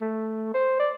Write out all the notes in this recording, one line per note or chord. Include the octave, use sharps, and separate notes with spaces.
A3
C5
D5